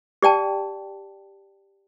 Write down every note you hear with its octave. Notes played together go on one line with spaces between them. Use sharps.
G4 D5 G5 A5